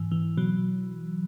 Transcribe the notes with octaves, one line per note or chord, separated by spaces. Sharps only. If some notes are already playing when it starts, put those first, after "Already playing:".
Already playing: G#2 E3
E3
B2 F#3